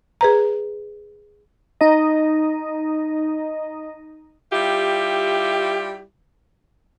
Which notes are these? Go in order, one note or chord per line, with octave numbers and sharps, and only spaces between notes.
G#4 B4 A#5
D#4 D#5
G3 E4 F4 G4